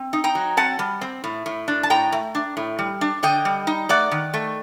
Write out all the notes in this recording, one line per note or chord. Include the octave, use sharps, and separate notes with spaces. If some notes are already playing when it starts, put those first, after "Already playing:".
Already playing: C4
D#4
G5 A#5
F#3
C4 F#5 A5
G3
C4
A2
A2
D4
A5
A2 G5 A#5
A3
D4
A2
G3
D4
D3 D#5 G5
G3
D#4
A3 D5 F#5
D#3
A3